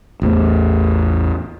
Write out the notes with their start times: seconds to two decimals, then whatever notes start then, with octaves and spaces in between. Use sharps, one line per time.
0.22 A1 E2 A3